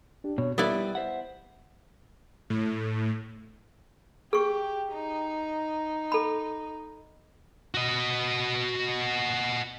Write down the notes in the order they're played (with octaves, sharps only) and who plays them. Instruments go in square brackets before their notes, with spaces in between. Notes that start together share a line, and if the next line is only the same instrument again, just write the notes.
[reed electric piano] D4 G4
[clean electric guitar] B2 [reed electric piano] C#5
[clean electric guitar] G3 [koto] B3 E4 D5 [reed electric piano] G4
[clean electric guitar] C5 E5 F#5
[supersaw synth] A2
[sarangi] G4 [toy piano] G#4 C#6
[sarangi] D#4
[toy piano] A4 B5
[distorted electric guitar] F#4 D#5